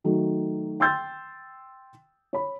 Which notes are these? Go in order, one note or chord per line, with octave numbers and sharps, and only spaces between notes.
D#3 F#3 A3
G5 C6 E6 G6 A6
C#5 B5